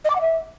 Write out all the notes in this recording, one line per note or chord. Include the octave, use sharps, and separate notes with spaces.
D#5
D6
F#5
E5